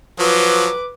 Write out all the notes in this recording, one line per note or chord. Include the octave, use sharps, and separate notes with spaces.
F3 F#3 B4 D6